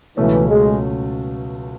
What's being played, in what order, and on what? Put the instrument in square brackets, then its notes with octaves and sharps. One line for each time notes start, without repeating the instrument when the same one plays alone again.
[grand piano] C#2 B2 F#3 A3 C#4 [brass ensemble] E3
[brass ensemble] G#3